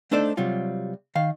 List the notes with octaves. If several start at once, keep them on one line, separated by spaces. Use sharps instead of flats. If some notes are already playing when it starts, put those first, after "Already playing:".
A3 D4 D#4 A4 C5 D5
C3 F#3 G3 F4
D#3 F5